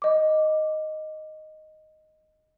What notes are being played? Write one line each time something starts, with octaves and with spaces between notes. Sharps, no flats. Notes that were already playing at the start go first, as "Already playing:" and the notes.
D#5 D6